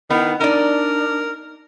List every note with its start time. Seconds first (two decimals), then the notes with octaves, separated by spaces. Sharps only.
0.10 D#3 B3 E4
0.40 D4 D#4 A#4 D5